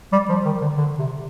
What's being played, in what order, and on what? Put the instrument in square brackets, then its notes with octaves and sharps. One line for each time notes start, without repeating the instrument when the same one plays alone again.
[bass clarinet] G3
F3
D#3
D3
D3
C3